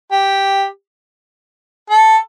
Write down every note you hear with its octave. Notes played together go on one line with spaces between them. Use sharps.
G4
A4